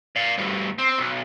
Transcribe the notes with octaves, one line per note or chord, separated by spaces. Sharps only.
D5 F5
D2 G2
C4
B1